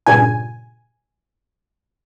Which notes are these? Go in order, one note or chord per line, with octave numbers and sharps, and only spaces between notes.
G2 A#2 C#3 G#5